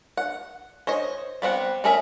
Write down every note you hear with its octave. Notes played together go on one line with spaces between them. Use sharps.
F#5
C5 C#5 D#5
G3 B3 C4 F#5
A3 C#4 G#4 A#4 E5